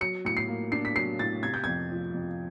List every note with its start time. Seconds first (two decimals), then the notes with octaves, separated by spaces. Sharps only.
0.01 F#3 C#7
0.25 A2 C#7
0.37 C7
0.48 A#3
0.72 D4 C7
0.85 B6
0.96 F#3 C7
1.19 A2 A6
1.43 C3 G#6
1.54 G6
1.64 F2 G#6
1.91 F3
2.14 F2